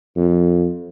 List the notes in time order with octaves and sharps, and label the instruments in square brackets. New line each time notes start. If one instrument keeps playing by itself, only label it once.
[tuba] F2